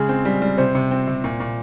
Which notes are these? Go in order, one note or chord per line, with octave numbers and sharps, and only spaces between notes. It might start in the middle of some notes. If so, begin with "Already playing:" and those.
Already playing: C#3 G#3 G#4
C4
G3
G3
C3 C5
C3
C4
C3
A#2
A#2